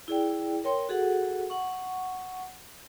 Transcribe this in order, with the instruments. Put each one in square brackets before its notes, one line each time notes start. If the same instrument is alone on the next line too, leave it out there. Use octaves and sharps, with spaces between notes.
[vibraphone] E4 G#4 D5 G5
A#4 C#5 G5 C6
F#4 G#4 A4 F#5
F#5 C#6